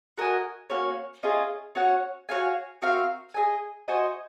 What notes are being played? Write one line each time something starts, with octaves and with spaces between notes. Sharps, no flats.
F#4 A#4 D#5 G#5
A#3 C#4 F#4 C#5
C#4 F4 G#4 D#5
C#4 F#4 C#5 F#5
F#4 C#5 F5 G#5
C4 F#4 A#4 F5
G#4 D#5 G#5
F#4 C5 D#5 G#5